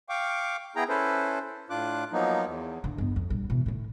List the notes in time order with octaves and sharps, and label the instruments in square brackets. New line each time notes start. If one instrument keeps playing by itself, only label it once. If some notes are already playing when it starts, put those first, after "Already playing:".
[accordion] F5 G5 C#6 D6
B3 E4 G#4 G5 A#5
C#4 E4 A4 B4 C5
A2 D4 F4 D6 F#6
F3 F#3 A#3 B3 D#4
E2
[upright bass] D3
G1 B3
F2
A#1 G3
B2 E3
A2 D#3